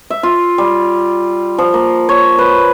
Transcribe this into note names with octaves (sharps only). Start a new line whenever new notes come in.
E5
F4
G3
F3
A#3
C#5
B4